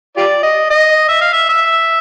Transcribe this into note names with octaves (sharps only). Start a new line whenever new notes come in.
F4 G4 D5
D#5
D#5
E5
F5
E5
E5